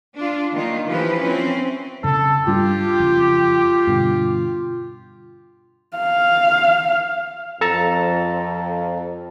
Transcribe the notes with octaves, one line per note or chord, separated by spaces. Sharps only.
D4 F4
D#3 A#3 F4
E3 F3 G4 B4
C4 C#4 E4
F#2 C#3 A4
G2 G3 D4 F4 G4
F#1 F2
G2 B2 D3
F5
F2 A4 A5 A#5